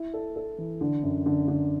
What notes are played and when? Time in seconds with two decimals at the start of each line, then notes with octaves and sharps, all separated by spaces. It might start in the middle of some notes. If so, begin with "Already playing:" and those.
Already playing: E4
0.14 A4
0.36 A4
0.58 E3
0.81 D3
1.03 F#2
1.26 D3
1.48 D3